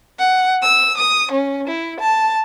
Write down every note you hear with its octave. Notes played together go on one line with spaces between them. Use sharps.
F#5
E6
D#6
C#4
E4
A5